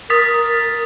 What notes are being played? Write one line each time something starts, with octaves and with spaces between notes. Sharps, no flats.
A#4 D#6 A6 B6